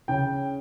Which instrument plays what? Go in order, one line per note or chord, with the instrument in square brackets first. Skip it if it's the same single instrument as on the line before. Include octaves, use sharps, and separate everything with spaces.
[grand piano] C#3 G5